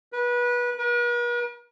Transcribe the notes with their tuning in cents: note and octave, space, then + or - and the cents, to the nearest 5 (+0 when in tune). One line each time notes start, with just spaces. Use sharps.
B4 -25
B4 -45